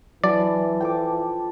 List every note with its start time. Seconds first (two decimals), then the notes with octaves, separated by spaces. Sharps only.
0.24 E3 F#3 D4 D5
0.81 F3 A4 G5 D6